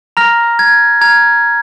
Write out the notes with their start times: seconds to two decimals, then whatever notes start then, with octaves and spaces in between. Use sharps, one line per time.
0.17 A#5 F6 A#6
0.59 G#6
1.01 A#5 F6 G#6